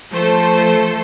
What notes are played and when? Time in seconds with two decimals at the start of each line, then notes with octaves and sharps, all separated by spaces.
0.13 F3 A3 A4 C5